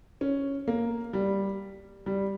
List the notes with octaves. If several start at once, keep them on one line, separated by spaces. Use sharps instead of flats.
C#4
A#3
G3
G3